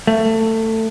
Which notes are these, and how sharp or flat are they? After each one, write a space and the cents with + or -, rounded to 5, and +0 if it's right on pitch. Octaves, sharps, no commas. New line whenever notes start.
A3 +20